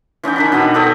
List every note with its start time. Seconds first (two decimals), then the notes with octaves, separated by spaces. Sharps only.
0.24 E3 C#4 D#4 G5
0.36 D#3 D4 B5
0.52 B2 B3 D#5 B5
0.74 G4 A4 C#5 D#5